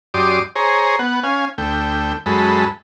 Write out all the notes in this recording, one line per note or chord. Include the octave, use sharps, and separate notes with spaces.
F#2 G4 D5 C6 D6 D#6
G#4 C5 C#5 A#5
B3 F#5
C#4 F5 G#5
D2 A3 G5
F#2 G#3 A4 B5